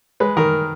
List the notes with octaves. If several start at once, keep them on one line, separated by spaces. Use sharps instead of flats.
G#3 B4
D#3 A#4